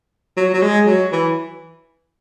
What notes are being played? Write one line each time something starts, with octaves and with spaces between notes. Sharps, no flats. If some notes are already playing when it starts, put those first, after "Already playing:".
F#3
F#3
G#3
F#3
E3